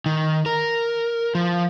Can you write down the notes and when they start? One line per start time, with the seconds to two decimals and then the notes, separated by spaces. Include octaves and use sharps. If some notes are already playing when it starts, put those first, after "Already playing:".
0.06 D#3
0.46 A#4
1.35 F3